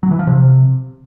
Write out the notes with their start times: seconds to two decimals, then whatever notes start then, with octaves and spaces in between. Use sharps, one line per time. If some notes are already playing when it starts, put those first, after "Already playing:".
0.03 F#3
0.11 E3
0.19 F3
0.27 C3